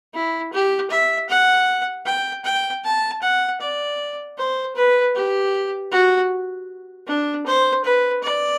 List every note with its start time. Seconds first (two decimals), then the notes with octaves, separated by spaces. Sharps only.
0.14 E4
0.53 G4
0.91 E5
1.29 F#5
2.06 G5
2.45 G5
2.84 A5
3.22 F#5
3.61 D5
4.38 C5
4.76 B4
5.15 G4
5.92 F#4
7.07 D4
7.46 C5
7.84 B4
8.23 D5